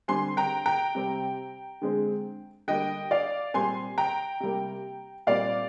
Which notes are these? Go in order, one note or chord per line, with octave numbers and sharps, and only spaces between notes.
D3 G3 C4 G#5 C6
G5 A#5
G5 A#5
C3 G3 C4
D3 G#3 C4
D3 G3 A#3 D#5 G5
D5 F5
A#2 G3 C4 G#5 C6
G5 A#5
C3 G3 A#3
A#2 G3 C4 D5 F5